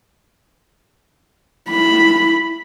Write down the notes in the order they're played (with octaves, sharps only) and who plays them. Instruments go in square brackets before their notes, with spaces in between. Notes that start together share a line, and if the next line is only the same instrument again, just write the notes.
[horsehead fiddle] E4 B5